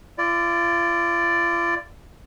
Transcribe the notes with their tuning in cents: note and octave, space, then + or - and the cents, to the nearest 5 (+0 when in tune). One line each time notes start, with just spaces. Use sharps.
F4 -40 D5 +0